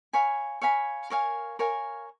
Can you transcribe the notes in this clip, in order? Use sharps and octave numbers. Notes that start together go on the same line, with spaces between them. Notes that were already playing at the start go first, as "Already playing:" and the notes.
C#5 F5 G#5 B5
C#5 F5 G#5 B5
A#4 C#5 F5 G#5
A#4 C#5 F5 G#5